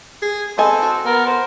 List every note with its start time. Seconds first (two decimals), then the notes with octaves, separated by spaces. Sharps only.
0.22 G#4
0.58 B3 C4 A4 D#5 G#5
0.82 F#4
1.05 B3 A#4
1.26 C5